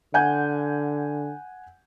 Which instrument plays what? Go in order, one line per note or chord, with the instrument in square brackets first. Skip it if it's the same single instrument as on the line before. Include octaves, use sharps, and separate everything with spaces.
[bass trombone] D3 [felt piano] F#5 G#5 G6